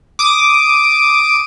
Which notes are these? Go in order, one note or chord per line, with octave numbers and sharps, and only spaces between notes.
D6 D#6